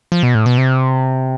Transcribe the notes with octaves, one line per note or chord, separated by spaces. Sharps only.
F3
B2
A2
B2
C3